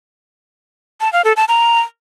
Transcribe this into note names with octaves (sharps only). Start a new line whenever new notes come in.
A5
F5
A4
A5
A#5